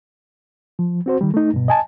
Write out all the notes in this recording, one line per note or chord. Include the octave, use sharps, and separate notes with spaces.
F3
C4 F#4 C5
D#3 G3
A3 D#4
G2 B2
D#5 G#5 A5